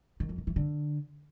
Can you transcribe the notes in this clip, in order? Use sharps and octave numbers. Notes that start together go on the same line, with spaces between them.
D#3
F2
D#3
E3
D3